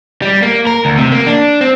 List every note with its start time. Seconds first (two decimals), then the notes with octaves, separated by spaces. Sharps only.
0.22 G3
0.42 A#3
0.67 A#4
0.85 D2
0.98 C3
1.12 A#3
1.27 D4
1.61 C4